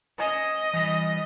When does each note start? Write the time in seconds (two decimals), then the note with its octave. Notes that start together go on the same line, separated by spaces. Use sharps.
0.18 C#4 C5 D#5 G#5
0.73 E3 G3